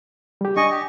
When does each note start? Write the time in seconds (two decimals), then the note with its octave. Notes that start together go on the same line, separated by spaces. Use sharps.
0.41 G3 G4
0.56 D4 D#5 G#5 C#6
0.71 G4